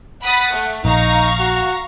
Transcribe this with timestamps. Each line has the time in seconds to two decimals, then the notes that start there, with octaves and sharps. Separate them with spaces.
0.23 F#5 B5 D#6 A6
0.52 A3
0.85 A#1 D#4 F5 A#5 C#6
1.40 F#4